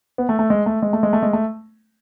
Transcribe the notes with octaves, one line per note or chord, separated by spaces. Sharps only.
B3
A3
A3
G#3
A3
G#3
A3
G#3
A3
G#3
A3